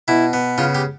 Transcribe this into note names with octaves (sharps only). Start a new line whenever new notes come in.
B2 E4
B3
C#3 F4
G4